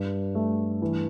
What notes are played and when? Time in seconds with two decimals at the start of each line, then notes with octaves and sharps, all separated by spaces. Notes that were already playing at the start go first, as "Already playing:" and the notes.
Already playing: G2
0.35 A3
0.82 E3